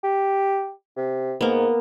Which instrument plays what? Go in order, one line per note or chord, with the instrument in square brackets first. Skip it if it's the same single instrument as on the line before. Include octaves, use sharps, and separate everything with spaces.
[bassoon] G4
C3
[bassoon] G#2 [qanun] A#3 B3